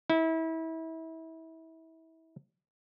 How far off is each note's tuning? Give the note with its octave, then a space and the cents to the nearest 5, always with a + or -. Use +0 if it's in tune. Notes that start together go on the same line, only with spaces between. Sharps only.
E4 -30